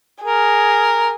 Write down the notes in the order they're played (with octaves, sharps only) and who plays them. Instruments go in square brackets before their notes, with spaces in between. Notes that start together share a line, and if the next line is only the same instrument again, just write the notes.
[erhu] G#4 [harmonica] A#4